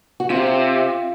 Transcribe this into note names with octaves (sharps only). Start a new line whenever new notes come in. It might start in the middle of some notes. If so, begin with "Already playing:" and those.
F#4
C3 F4